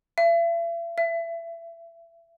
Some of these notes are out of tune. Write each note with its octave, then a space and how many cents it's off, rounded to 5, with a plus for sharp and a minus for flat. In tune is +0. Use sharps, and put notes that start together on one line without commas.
E5 +45
E5 +25